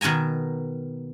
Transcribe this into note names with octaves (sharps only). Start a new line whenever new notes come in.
B2 D#3 A#4 G#5 A#5